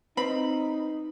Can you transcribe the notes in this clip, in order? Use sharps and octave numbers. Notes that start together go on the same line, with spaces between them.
C4 D#4 B4 B5